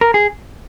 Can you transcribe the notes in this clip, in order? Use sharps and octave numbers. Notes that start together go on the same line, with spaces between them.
A#4
G#4